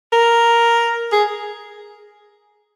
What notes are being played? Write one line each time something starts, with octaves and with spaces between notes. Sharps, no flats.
A#4
G#4